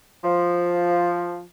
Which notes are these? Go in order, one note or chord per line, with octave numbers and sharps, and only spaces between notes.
F3